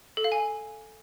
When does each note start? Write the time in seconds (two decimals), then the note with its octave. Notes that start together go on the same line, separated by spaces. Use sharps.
0.17 A4
0.24 F5
0.32 G#5